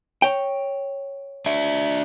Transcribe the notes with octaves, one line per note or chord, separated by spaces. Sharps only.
C#5 G5
D4 E5